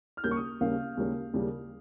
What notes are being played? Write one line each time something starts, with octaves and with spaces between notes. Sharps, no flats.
F6
D#2 C#3 G3 A#3 C#4 G6
C#6
D#6
D#2 C#3 G3 A#3 C#4 F5
D#2 C#3 G3 A#3 C#4
D#2 C#3 G3 A#3 C#4